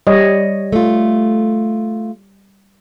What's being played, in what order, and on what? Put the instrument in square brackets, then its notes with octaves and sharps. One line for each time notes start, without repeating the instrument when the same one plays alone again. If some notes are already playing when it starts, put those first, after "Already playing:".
[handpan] G3 C#5 D#5
[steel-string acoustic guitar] A3 F4